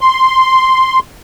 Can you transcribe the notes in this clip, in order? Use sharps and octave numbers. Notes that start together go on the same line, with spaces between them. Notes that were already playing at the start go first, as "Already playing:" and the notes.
C6